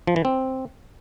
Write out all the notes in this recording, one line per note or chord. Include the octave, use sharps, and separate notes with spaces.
F3
E3
C4